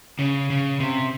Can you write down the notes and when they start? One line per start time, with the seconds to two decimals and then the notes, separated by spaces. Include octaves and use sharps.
0.19 C#3
0.50 C#3
0.80 C3